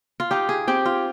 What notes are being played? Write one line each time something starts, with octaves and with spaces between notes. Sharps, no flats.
F4
D#4 G4
G#4
C4 G4
F4